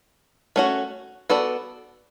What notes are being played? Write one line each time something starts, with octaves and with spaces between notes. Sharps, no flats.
A3 C#4 F#4
B3 F#4 A4 D5